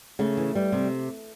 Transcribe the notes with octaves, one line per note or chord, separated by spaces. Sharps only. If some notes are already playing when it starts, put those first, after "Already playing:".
C#3 A3
E3
G3
C3